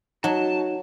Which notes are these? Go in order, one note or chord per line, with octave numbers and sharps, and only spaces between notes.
F#3 D#4 F#4 A5